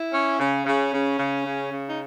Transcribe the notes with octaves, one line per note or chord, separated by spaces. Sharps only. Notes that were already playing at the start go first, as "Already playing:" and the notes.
Already playing: E4
C#4
C#3 C#4
C#3
C#3
C#3
C#3
C#3
D#4